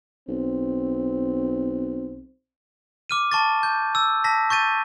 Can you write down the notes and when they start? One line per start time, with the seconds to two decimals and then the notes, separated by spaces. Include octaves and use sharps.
0.29 B1 C4
3.10 D6 F6 D#7
3.32 A5 C#6 A6
3.63 G6
3.95 E6
4.24 A5 A#6 B6
4.50 C#6 G6 A6 D#7